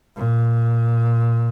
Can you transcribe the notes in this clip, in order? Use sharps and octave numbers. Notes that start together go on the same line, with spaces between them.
A#2